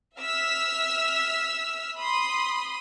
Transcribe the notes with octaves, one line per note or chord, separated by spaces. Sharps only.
E5 E6 F6 B6
B5 C6 D#6